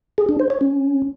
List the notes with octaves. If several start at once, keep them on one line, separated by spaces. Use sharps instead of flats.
G#4
D4
C5
C#5
C#4